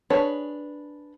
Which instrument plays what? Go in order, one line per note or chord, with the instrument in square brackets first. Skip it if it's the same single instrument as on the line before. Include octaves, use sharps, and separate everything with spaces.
[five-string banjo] D4 G#4 B4 C#5 A5